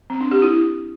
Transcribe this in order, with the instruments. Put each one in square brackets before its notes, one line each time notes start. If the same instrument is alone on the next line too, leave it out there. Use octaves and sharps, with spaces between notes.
[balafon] C4
D4
G4
E4